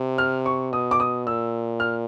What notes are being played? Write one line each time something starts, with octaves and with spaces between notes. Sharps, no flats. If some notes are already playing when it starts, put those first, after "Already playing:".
Already playing: C3
F6
C#6
B2 D#6
D6
D#6
A#2 E6
F6